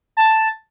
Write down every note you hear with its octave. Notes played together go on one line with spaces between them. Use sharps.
A5